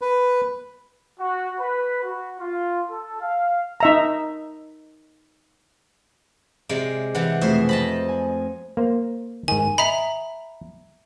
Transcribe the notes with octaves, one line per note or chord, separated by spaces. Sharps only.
B4
F#4
B4
F#4
F4
A4
F5
D#4 E5 A#5
C3 G#3 D5
C3 E3 F#5
F2 B2 A3 G#4 C5 E5
C4 D#5 A5 B5
G#5
A#3 C5
G#2 D#3 G#5
D#5 E5 A#5 B5